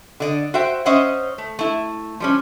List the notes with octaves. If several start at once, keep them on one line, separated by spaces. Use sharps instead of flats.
D3 D5 D#5
F#4 C5 E5 G5
C#4 C5 C#5 D#5 E5 F#5
A3
A3 E4
F3 G3 C#4